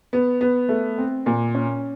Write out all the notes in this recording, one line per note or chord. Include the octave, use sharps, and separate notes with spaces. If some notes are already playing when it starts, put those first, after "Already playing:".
B3
B3
A3
C4
A#2
C#4